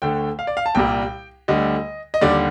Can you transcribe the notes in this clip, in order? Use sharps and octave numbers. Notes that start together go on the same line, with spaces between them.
D2 D3 A3 G5
F5
D5
F5
A5
C2 A#2 G3 G5
D2 D3 G3 D#5
D#5
D#2 D3 G3 D5